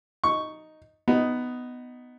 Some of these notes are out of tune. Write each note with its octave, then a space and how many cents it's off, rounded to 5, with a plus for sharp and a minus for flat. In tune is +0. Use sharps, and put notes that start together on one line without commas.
D#4 +0 C#6 +0
B3 +10 D#4 +0